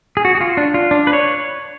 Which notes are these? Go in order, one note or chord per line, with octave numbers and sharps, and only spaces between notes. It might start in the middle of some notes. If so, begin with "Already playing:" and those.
G#4
F#4
F#4
F4
D4
F4
D4
B4
C#5